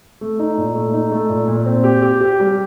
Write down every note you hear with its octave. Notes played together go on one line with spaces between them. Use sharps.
A3
D#4
A#2
A3
D#4
A3
A#2
A#2
C4
G4
G4
G4
G3